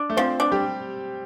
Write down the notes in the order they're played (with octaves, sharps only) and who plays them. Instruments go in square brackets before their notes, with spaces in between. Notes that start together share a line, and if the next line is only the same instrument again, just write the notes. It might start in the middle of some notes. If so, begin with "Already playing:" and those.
Already playing: [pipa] D4
[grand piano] A3
[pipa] F3 [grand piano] C4
[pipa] D4
[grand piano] G3 G4